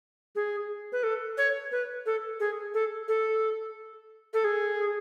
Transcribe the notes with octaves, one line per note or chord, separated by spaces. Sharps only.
G#4
B4
A4
C#5
B4
A4
G#4
A4
A4
A4
G#4